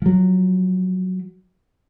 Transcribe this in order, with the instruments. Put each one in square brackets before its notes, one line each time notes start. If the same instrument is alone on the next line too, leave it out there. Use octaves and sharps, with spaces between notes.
[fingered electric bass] F3 F#3